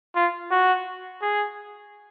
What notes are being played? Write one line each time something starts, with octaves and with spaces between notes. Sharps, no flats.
F4
F#4
G#4